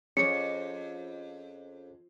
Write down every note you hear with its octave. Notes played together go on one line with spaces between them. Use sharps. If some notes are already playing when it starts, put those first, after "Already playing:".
F2 C#4 G#4 C#7